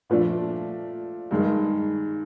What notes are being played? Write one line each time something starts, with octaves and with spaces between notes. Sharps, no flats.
A#2 F3 A3 D4
G2 D#3 G#3